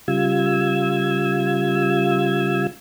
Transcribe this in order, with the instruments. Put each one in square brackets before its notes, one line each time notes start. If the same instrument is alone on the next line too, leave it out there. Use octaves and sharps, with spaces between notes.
[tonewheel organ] C#3 G3 F4 E6 G#6